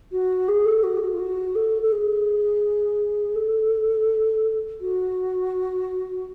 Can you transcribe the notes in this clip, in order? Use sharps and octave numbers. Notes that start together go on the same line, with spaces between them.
F#4
G#4
A4
F#4
G#4
F#4
F4
F#4
A4
A4
G#4
A4
F#4